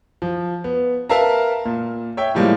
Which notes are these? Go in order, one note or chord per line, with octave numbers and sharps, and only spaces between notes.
F3
B3
A#4 B4 E5 F5 A5 A#5
A#2
C#5 E5 G5
A2 F3 G3 G#3 A#3